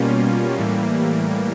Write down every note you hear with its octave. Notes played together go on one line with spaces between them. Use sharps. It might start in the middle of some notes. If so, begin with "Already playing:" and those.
Already playing: B2 G3 A#3 C#4 F4
A2 E3 G3 A#3